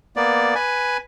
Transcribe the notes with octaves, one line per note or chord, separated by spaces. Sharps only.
A#3 B3 D5
B4 G#5